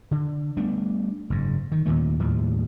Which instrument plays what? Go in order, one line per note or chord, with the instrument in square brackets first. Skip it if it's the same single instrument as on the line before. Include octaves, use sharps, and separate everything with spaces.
[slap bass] D3
G3 A3 B3 D4
F#1 G#2
D#3
D#2 A#2 D#3 A3
D#2 A2 F3 G3